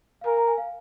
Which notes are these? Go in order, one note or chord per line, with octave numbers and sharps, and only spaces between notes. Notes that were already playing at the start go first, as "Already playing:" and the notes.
F5
A#4 G#5
A#5
G#5
F5